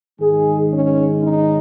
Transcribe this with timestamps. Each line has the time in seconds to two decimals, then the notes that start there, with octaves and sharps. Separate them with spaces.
0.20 G#2 D#3 G#3 G#4
0.72 C#4
1.23 D#4